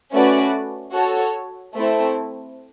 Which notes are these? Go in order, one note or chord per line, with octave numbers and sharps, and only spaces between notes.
A3 C#4 F#4 B4 D5
F#4 A4 C#5
A3 C4 E4